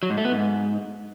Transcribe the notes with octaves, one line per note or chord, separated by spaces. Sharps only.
F#3
G#2
A3
B3
G#2